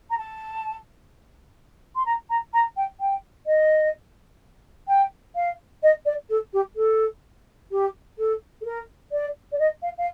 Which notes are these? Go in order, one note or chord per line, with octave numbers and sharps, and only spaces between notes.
A#5
A5
C6
A#5
A#5
A#5
G5
G5
D#5
G5
F5
D#5
D5
A4
G4
A4
G4
A4
A4
A#4
D5
D5
D#5
F5
F5